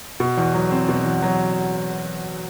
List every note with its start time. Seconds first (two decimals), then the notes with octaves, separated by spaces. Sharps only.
0.20 B2
0.37 E2
0.54 F#3
0.71 C4
0.89 B2
1.05 E2
1.22 F#3